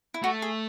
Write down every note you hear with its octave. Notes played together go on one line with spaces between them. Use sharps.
E4
A3 F#4
G#4